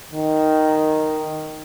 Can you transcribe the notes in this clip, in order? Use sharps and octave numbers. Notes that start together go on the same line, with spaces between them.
D#3